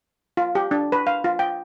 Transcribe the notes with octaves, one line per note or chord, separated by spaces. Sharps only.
F4
G4
D4
B4
F5
F4
G5